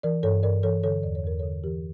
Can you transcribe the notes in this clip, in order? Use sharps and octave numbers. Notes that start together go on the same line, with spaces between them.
E3 A#4 D5
G2 A4 C#5
G2 A#4 D5
E3 A4 C#5
D3 A4 C#5
E2 D5
C#5
E2 A#4
A4 C#5
D3
E3 G4 A#4